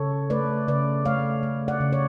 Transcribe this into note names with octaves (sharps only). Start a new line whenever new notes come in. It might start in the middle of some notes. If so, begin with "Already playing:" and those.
Already playing: C#3 A4 C#5
A3 B4 D5
C#3 B4 D5
A3 C#5 F5
A3
D5 F#5
C#3
C#5